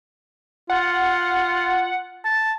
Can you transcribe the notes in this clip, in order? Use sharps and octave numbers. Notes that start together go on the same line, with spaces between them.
F4 F#5
A5